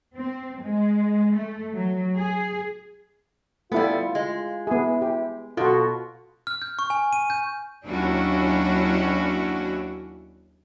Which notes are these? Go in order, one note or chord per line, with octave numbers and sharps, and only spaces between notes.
C4
G#3
A3
F#3
G#4
G3 A3 B3 E4 F4
G#3
B3 E4 G#4
G4
B2 F4 F#4 A4
F6
G6
C#6
G#5
D#7
G6
D#2 F#3 C#4 D4 E4 F#4